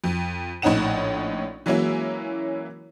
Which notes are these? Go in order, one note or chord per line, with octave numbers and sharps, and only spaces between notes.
F2
A#1 A2 C#4 D#4 F#5 E7
E3 F#3 G#3 A#3 C#4 E4